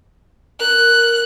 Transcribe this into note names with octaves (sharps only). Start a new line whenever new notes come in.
A#4 F#6